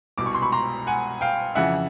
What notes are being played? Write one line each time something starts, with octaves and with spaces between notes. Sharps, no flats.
C2 B2 D6
C#6
C6
B5 C#6
A#5 C6
F#5 G#5
F5 G5
F2 C#3 E3 E5 F#5